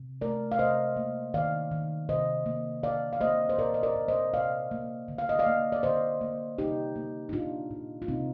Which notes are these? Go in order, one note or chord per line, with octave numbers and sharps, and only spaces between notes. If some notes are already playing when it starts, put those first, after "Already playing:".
Already playing: C3
A3 A#4 D5
F5
C3 C5 D#5
A#3
D#3 D5 F5
D#3
C3 C5 D#5
A#3
D3 D5 F5
F5
A#3 C5 D#5
C5
A#2 A#4 D5
D#5
A#4 D5
A#2
C5 D#5
C3 D5 F5
A#3
D3
F5
D#5
D5 F5
A#3
D5
D3 C5 D#5
A#3
C3 D#4 G4
A#3
D#4
A#2 D4 F4
A#2
F4
C3 C4 D#4